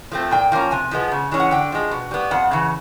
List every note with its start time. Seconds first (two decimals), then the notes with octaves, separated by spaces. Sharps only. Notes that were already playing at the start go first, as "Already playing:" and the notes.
0.12 F3 A3 C4
0.31 A#2 G5
0.52 F3 A#3 C#4
0.71 C3 G#5
0.91 F3 G#3 B3
1.11 C#3
1.32 E3 G#3 C#4
1.40 F#5
1.51 D3 G5
1.72 F3 G#3
1.91 B2
2.11 G3 B3
2.31 F2 F#5
2.51 C#3 E3